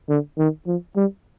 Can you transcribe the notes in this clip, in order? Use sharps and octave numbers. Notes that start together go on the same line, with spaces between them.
D3
D#3
F3
G3